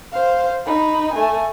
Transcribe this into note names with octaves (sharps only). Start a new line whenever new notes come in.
C5 F5
D#4 B5
A3 G#5